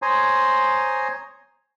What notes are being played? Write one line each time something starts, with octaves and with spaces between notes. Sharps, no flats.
C5 C#5 G#5 A#5 C6 D#6